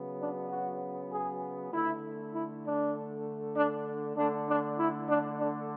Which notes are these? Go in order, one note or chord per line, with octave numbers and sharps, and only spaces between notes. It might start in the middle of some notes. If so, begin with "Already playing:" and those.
Already playing: C#3 F#3 B3
D4
F#4
G#4
D3 A3 E4
E4
D4
D4
D3 A3 D4
D4
E4
D4
D4